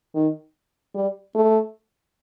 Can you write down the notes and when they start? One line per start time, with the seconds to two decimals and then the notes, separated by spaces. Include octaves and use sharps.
0.15 D#3
0.95 G3
1.35 A3